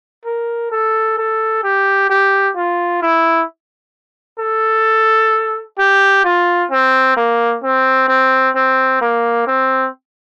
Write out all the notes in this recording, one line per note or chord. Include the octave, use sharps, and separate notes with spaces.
A#4
A4
A4
G4
G4
F4
E4
A4
G4
F4
C4
A#3
C4
C4
C4
A#3
C4